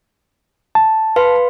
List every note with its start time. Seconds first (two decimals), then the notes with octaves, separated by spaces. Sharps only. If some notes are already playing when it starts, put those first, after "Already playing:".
0.75 A5
1.16 B4 F5 C6